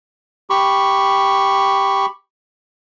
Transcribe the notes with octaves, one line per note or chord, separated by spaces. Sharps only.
G4 B5 C#6